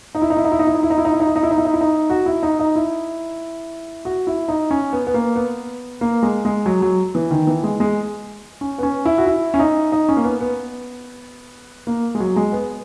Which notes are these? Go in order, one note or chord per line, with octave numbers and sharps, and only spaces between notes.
D#4
E4
D#4
E4
D#4
E4
D#4
E4
D#4
E4
D#4
E4
D#4
E4
D#4
E4
D#4
E4
D#4
E4
D#4
E4
D#4
F#4
E4
D#4
D#4
E4
F#4
E4
D#4
C#4
B3
B3
A#3
B3
A#3
G#3
G#3
F#3
F#3
E3
D#3
E3
G#3
G#3
C#4
B3
C#4
E4
F#4
E4
C#4
D#4
D#4
C#4
A#3
B3
B3
A#3
G#3
F#3
G#3
B3